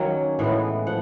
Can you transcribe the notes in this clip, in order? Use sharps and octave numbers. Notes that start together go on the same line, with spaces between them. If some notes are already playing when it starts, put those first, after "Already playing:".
Already playing: D#3 F#3 A#3 C#4 F#5
A2 E3 G#3 B3
F3 F#5